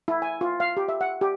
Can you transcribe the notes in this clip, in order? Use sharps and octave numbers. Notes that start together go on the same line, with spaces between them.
E4
G#5
F4
F5
G4
E5
F#5
G4